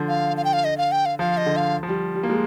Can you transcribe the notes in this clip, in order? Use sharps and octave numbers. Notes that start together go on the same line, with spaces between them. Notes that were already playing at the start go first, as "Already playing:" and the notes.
Already playing: D3 F3
F5
F5
G5
F5
D#5
F5
G5
F5
F3 F5
D#5
D3
F5
F3
G3
G3
A#3
G#3